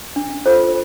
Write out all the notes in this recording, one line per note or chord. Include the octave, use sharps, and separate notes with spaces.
D4
F4 A4 C5